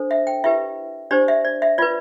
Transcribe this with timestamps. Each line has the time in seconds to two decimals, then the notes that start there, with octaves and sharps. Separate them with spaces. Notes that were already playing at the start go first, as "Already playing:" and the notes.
Already playing: D4 A4 C5
0.11 E5
0.27 G5
0.44 E4 G4 B4 E5
1.11 D4 G4 C5 D5
1.28 E5
1.45 D5
1.62 E5
1.78 F4 B4 D5